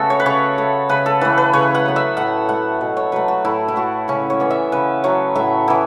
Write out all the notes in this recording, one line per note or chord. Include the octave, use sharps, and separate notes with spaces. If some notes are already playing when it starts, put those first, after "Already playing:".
Already playing: C#3 A3 B3 F#4 A4 E5
C#5
B4
C#3 C#5
A3
C#3 B4
A4
E3 A3 B4
B4
C#3 C#5
F#5
F#3 B3
E5
A2 F#5
A3 F#5
B2
C#5
F#3 A3 B4
F#4
A2 E4
E4
A3 F#4
C#3 C#4
C#5
E3 B3
E5
C#3 B4
F#3 A3 C#5
A2 E5
E3 B3 E4